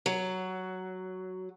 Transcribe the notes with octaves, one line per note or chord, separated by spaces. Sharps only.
F#3